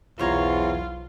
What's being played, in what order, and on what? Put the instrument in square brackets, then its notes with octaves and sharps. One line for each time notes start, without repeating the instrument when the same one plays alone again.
[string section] B1 [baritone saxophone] E2 [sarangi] F4 [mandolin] C5 C#5 A#5